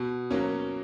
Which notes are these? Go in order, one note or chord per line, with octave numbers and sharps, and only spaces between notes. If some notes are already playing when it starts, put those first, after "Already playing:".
Already playing: B2
F#3 A#3 C#4